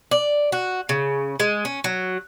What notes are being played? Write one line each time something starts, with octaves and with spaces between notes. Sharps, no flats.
D5
F#4
C#3
G#3
C#4
F#3